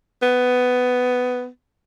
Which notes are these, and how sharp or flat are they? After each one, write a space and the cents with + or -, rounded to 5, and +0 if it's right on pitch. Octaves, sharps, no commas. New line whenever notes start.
B3 +15